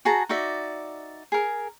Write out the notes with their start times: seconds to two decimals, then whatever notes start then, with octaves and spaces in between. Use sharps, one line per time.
0.05 F#4 G#4 A5 A#5
0.29 D#4 F#4 D5 E5
1.32 G#4 A#4